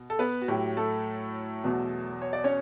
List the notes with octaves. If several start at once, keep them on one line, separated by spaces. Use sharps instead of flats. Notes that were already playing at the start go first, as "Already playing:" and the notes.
Already playing: B2
A4
B3 B4
F#4
A2 F#3 G4
A3 A4
E2 B2 F#3
C#5
D5
C#4 C#5